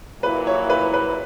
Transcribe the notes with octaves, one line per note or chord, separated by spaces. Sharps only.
A#2 F#3 A#3 E4 B4
C#5
B4
B4